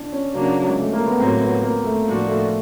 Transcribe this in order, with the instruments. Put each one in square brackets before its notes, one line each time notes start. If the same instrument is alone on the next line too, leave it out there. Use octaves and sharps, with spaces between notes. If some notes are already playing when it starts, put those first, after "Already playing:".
Already playing: [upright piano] D4
C#4
[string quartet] C#3 F#3 A#3 D4
[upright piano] G#3
A3
A#3
B3
[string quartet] A2 F#3 A#3 [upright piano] C4
[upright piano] B3
A#3
A3
[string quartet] A2 F3 A#3 D4 F#4
[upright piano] A3